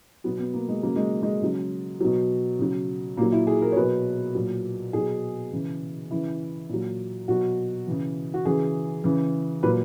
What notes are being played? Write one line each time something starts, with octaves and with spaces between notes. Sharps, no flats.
B2 F#3 B3
B3
A#3
G#3
C#3 F#3 A#3
G#3
G#3
C#3 F#3
B2 F#3
C#3 F#3
A#2 F#3 A#3
E4
G#4
A#4
C#5
B2 F#3 B4
A#2 F#3
B2 F#3 G#4
C#3 E3
C#3 E3 E4
A#2 F#3
B2 F#3 F#4
C#3 E3
F#4
C#3 E3 G#4
C#3 E3
A#2 F#3 B4